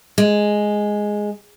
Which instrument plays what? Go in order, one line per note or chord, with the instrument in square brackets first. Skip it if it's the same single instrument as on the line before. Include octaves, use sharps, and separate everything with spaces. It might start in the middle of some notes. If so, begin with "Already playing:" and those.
[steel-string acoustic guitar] G#3